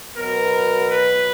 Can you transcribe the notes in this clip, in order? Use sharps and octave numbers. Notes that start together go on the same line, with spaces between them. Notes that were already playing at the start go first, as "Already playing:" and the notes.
B2 F#3 B3 A#4
B4